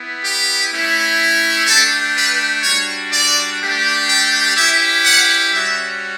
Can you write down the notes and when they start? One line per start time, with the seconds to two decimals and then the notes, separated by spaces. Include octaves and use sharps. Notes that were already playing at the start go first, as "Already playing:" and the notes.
Already playing: B3 E4
0.22 G4
0.71 A3 C#4 E4
1.66 A3 D4 G4 A4
2.15 B4
2.62 G3 D4 F#4 C#5
3.10 D5
3.59 A3 D4 G4
4.07 G5
4.55 C#4 E4 G4 E5
5.04 F#5
5.51 G3 C#4 F#4 E5